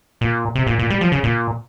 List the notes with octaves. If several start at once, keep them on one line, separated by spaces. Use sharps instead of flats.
A#2
C3
A#2
A#2
G3
F3
C#3
A#2